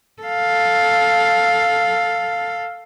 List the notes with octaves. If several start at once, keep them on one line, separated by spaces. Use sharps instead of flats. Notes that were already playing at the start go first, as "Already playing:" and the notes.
A4 F5